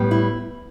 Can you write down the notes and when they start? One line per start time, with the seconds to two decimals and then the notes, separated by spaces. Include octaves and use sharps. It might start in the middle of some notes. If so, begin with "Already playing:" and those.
Already playing: A2 G3 B3
0.11 E4